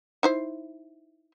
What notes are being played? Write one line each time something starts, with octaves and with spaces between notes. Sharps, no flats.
D#4 E4 C5